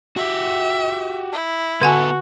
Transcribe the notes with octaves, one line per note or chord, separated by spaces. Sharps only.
F#4 G4 E5
E4
D3 B3 F#4 A4 F#5 G#5